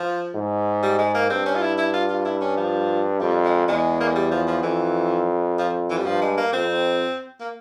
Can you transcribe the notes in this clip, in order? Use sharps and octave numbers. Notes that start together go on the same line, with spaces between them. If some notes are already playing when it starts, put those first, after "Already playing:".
Already playing: F3
G#2
G3
G#3
A#3
G2 C4
C#4
F4
E4
E4
F4
F4
E4
C#4
F3
F2 G3
G#3
E2 G#3
A#3
G#3
G3
F3
F3
F2 E3
F3
E3
G3
G2 F3
G#3
A#3
F2 C4
A#3